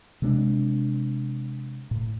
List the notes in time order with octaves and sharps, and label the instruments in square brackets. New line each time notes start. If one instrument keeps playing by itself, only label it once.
[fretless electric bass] C3 G#3 C4 D4
A2